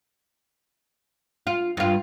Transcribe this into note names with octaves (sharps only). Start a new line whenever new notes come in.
F4
G2 F4